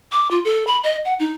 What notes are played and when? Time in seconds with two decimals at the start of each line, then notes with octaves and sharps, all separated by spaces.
0.12 D6
0.31 F4
0.45 A4
0.67 B5
0.84 D#5
1.05 F#5
1.19 D#4